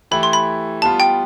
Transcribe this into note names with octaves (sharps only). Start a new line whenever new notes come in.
E3 A3 E4 G4 B5
C6
B5
G3 B3 F4 A5
G5